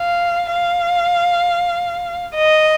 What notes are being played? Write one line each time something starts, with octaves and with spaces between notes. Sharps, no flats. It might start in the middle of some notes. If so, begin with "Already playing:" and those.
Already playing: F5
F5
D#5